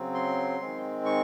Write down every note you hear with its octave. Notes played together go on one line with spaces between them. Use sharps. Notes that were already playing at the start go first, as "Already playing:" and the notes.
Already playing: C#3 F#3 C4
C6
D#3 G#3 C4
C#6